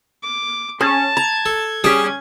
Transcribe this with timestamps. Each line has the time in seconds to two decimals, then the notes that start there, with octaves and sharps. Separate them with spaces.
0.23 D6
0.81 C#4 G#4 A5
1.17 A#5 G#6
1.46 A4
1.84 G3 C#4 G4 G#4 A5 D#6